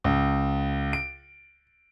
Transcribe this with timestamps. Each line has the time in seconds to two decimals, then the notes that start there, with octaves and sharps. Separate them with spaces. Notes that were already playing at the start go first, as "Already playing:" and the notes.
0.04 C#2
0.93 D7